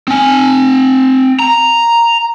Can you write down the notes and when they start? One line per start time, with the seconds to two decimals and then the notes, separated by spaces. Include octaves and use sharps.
0.08 C4 G#5
1.39 A#5